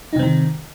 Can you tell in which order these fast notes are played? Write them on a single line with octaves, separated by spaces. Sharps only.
D#4 C3 C4 D#3